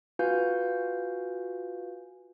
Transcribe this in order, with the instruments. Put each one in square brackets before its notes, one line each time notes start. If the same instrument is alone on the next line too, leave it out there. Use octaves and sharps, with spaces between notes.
[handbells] F4 F#4 B4 F5 G#5 G6